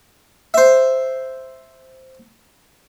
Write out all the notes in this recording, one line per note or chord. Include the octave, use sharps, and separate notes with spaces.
C5 E5